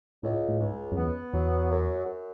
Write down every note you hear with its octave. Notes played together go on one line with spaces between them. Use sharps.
C#2 A2
A2
C#2 G#2
F#2
E2 B3
E2 F#3
F#2
F#2